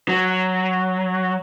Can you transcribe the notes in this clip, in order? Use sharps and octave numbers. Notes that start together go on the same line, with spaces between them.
F#3